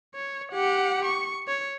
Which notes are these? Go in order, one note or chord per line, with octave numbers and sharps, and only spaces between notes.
C#5
G4 F#5
C#6
C#5